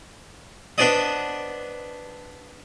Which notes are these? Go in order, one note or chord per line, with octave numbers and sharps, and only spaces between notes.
B3 D4 C5 D5 D#5